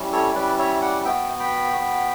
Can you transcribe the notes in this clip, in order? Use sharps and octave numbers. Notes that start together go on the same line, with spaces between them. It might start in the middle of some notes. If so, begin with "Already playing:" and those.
Already playing: G3 C#4 E4
A4 C#5
G3 C#4 E4 B4 D5
C#5 E5
D5 F#5
B3 F#4 E5 G5
G5 B5
B3 F#4